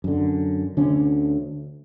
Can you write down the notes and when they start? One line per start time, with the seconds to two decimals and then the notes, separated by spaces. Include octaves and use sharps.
0.04 F#2 D3
0.77 D2 D3 C#4